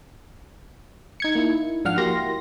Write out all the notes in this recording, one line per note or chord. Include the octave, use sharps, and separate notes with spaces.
D#4 G#6 C#7
A#3 D#4 E4
G#2 F3 D4 F5 F#5 F6
A#3 E4 F#4 G4 C6 A#6